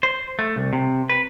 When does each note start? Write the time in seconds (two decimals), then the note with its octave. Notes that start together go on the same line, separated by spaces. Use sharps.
0.03 C5
0.39 A3
0.56 C2
0.73 C3
1.09 B4